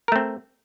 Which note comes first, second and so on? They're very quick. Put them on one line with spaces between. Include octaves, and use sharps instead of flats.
A#4 A3 C4